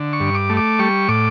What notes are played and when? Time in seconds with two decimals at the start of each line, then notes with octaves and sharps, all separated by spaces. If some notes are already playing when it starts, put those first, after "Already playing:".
Already playing: D3
0.13 C#6
0.20 G2
0.35 D6
0.49 A3
0.57 D6
0.79 G3 C#6
1.09 A2 D6